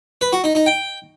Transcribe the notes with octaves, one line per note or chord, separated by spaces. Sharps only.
B4
F#4
D#4
D#4
G5